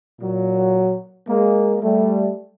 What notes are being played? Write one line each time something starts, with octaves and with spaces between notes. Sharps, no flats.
A#2 F#3
G#3 A#3
G3 A3